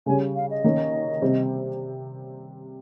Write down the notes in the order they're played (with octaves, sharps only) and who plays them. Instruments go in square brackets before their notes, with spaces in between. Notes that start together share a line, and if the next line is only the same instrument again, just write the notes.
[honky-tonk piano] C#3 G3 C#4 [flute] G#5
[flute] F5
D#5
[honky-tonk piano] D#3 A#3 C#4
C3 G3 C4